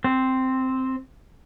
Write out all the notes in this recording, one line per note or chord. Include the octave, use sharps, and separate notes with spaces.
C4